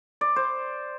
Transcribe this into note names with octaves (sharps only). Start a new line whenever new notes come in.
D5
C5